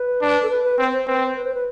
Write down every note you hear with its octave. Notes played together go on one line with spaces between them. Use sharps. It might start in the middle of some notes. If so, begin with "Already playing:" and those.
Already playing: B4
D4
A4
B4
B4
C4 C5
C5
C4 B4
C5
B4
C5
B4